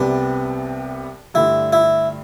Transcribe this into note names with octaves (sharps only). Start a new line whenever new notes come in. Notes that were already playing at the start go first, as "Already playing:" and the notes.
Already playing: C2 C3 G3 B3 D4
G2 D3 A3 D4 E4
E4